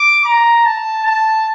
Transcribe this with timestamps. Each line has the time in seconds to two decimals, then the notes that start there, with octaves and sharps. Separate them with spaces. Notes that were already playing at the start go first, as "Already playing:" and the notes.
Already playing: D6
0.25 A#5
0.65 A5
1.05 A5